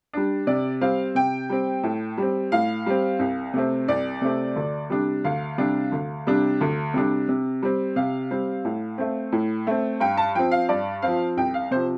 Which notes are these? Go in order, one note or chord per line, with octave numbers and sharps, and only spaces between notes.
G3 D4
C3 D5
G3 C4 F5
C3 G5
G3 C4
A2
G3 C4
A2 F5
G3 C4
C2
C3 A3 C4
C2 D5
C3 A3 C4
D2
C3 G3 D4
D2 F5
C3 G3 D4
D2
C3 G3 D4
D2
C3 G3 D4
C3
G3 C4
C3 F5
G3 C4
A2
A3 C4
A2
A3 C4
G2 G5
A5
F3 C4 G5
F5
G2 D5
F3 C4 F5
C2 G5
F5
C3 F3 C5